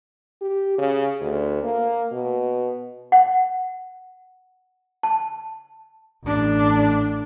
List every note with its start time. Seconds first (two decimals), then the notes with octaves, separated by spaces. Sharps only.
0.42 G4
0.78 C#3
1.21 D2
1.63 A#3
2.12 B2
3.12 F#5
5.03 A5
6.25 A1 D4